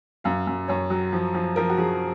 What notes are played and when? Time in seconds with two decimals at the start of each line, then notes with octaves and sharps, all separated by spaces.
0.24 F#2 F5
0.47 F#2
0.68 F#2 C#5
0.90 F#3
1.13 F3
1.34 F3
1.56 F3 A#4
1.70 F#4
1.78 F3 G#4